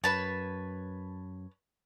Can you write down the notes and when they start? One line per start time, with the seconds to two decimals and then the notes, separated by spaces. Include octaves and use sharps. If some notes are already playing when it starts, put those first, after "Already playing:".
0.04 F#2 B4 C#5 A5